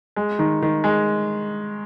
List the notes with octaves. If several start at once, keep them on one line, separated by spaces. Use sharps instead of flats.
G#3
D#3
D#3
G#3